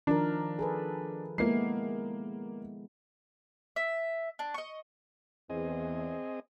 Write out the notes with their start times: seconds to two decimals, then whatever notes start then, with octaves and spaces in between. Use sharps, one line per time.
0.07 D#3 F3 D4 A#4
0.59 G#4 A4 B4
1.38 G#3 A#3 B3 E4 C7
3.76 E5
4.39 D4
4.54 D#5 C#6
5.50 E2 C4 G#4 D#5